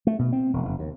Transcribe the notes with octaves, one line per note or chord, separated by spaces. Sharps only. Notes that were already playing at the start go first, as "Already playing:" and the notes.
A3
B2
C4
E1
F#1
D#2